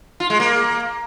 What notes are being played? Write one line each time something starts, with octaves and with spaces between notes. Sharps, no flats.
F4
G#3
A#3